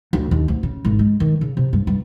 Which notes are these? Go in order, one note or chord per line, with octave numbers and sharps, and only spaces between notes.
D2
D#2
D2
C#3
G#1
G#3
D#3
C#3
C3
G2
G2